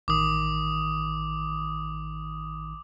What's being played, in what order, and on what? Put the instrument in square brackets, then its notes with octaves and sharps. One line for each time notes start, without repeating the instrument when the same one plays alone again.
[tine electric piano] A1 D#3 [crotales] D6 D#6